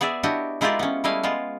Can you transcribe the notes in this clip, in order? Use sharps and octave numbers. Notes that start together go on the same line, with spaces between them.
B3 G#4 D5 E5
D4 E4 F#4 G4 D#5
G#3 E4 F4 G4 A#4 D5
B3 C#4
G3 A3 E4 D#5 F5 G#5
G#3 B3 F4